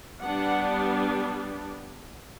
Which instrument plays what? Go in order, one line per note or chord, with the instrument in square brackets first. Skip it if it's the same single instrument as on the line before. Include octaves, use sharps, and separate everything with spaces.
[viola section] G3 B3 D4 F#5